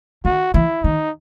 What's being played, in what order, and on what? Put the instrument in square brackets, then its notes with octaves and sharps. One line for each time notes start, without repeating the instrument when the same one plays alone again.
[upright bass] D#3 [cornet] F#4
[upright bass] E3 [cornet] E4
[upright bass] D#3 [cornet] D#4